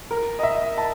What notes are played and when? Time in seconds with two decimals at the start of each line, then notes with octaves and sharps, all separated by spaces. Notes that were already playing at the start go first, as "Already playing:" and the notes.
0.11 A#4
0.39 D#5
0.43 E5
0.78 A5